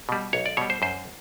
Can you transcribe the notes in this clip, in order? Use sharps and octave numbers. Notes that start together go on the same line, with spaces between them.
B2 G3
B1 C#5
D5
B2 G3 C#5
C5
F#2 C5